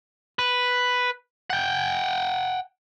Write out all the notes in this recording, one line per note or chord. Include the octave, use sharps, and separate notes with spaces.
B4
F#5 G5